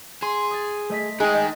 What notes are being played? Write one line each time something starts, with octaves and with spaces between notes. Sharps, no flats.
G#4 C6
D#6 G#6 A6
A3 D#5 B6
G#3 D#4 G#4 G5
D#5 G6 A6